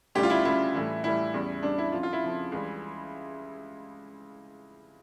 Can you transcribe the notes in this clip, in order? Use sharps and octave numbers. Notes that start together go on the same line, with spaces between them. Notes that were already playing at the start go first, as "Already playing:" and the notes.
D2 C#3 G3 G4
F4
E4
D2 C#3 G3 E4
A2 E3 G3
A2 E3 G3 E4
E2 C#3 G3
E2 C#3 G3 D4
E4
F2 C#3 F3 F4
F4
E4
F2 C#3 F3
C#2 C#3 E3 G3